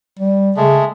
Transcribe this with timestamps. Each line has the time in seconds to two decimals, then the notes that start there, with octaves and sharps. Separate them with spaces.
0.19 G3
0.57 C#3 G#3 A3